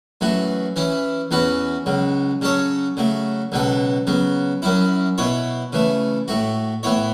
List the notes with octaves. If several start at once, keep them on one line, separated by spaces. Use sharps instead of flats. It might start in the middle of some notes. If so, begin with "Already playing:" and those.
F#2 E3 A3 F#4
E3 C#4 E4
E2 E3 C#4 F#4 B4
C#2 C#3 F#3
C#3 F#3 C#4 A4 C#5
C#3 F#3 A3
C#2 B2 F#3 B3 A4
C#3 F#3 B3
F#2 F#3 C#4 E4
B2 B3 E4 C#5
C#3 E3 A3
A2 A3 F#4
A2 E3 B3 E4 C#5